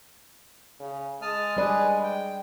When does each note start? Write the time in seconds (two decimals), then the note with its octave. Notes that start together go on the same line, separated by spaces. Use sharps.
0.80 C#3
1.22 G#3 A5 D#6 F6
1.57 G3 G#4 B4 D5
2.03 G5